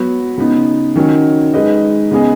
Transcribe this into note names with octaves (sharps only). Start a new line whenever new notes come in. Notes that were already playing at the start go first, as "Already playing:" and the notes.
Already playing: F#3 B3 F#4 B4
C#3 B3 D#4
D#3 F#3 C#4
G#3 D#4 B4 D#5
C#3 B3 G#4 D#5